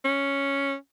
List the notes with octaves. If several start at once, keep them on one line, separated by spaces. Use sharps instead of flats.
C#4